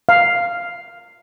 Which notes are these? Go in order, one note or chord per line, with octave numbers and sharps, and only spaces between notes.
F5